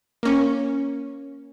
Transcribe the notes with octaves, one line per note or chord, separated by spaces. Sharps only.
A#3 C#4